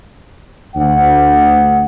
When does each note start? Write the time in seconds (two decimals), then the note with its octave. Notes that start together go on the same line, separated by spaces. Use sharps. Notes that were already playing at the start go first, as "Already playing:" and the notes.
0.76 D2 F#5